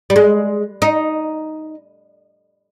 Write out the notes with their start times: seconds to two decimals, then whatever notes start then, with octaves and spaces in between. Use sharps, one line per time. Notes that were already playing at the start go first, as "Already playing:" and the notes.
0.10 G3
0.16 G#3
0.82 D#4